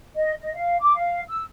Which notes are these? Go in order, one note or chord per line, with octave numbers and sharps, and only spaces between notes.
D#5
D#5
F5
D6
F5
E6